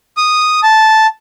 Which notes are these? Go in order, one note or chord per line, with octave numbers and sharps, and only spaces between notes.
D#6
A5